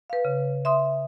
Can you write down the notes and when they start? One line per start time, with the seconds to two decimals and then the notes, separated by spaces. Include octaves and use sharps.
0.10 B4 F5
0.25 C#3
0.65 E5 C6 D#6